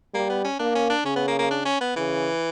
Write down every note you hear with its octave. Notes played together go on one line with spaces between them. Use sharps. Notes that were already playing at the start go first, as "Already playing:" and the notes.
G3 A#3
B3
C#4
A#3 D4
C#4
D4
C#3 C#4
B3
A#3
A#3
D4
C#4
B3
C#3 E3